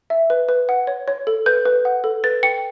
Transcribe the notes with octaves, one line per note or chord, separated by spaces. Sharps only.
E5
B4
B4
F#5
C#5
C#5
A4
B4 G6
B4
F#5
A4
B4 A6
G5 C#7